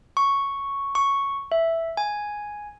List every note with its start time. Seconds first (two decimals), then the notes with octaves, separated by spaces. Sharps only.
0.17 C#6
0.95 C#6
1.52 E5
1.97 G#5